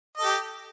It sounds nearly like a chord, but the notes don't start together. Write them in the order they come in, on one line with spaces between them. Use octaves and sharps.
D#5 A4 G4